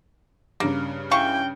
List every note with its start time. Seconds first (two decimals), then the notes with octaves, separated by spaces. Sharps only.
0.60 G2 C#3 A#3
1.11 E3 F5 G5 C#6